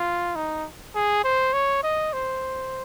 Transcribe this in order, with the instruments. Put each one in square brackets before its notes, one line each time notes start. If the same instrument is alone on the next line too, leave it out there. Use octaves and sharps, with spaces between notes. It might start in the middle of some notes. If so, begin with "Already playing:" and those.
Already playing: [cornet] F4
D#4
G#4
C5
C#5
D#5
C5